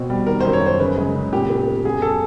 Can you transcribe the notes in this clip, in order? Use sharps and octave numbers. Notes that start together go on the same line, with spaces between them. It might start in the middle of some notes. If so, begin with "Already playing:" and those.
Already playing: B2 C4
G3
D#3 A#4
C5
F#2
C#5
F#2 C5
C#3 B4
G#3
C#3
A#2 G4
B3
B3
F#2 G#4
A4